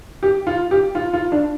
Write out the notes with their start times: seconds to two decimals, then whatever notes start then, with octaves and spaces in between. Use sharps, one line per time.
0.23 G4
0.47 F4
0.71 G4
0.95 F4
1.13 F4
1.32 D4